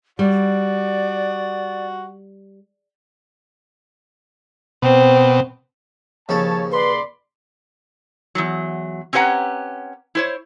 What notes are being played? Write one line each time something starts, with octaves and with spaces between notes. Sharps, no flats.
G3 F#4 D5
B2 C4
D#2 C#3 F3 A4 C#5 A5
B4 D5 B5 C6
E2 G2 F#3
C4 C#4 G4 B4 F#5 A#5
E4 C5 C#5